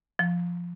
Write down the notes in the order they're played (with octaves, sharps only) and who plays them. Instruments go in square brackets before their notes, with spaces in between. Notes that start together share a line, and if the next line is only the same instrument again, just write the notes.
[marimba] F3